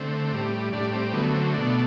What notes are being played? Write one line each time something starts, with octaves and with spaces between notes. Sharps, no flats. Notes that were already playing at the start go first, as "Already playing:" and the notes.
Already playing: D3 A3 C4
A2 G3
A2 G3 D4
C4
D3 F#3 A3 B3
C4
B2 A3 D4